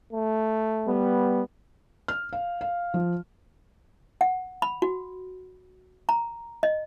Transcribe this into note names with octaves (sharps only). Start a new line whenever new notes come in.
A3
G3 B3
F6
F5
F5
F3
F#5
B5
F#4
A#5
D#5